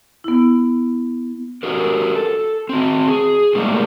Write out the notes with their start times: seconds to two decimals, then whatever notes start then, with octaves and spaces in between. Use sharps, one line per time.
0.24 B3 E4
1.63 F#4 G4 A#4
2.15 A4
2.69 C4 F#4
3.08 G#4
3.55 A2 G3 G#3 A#3 D4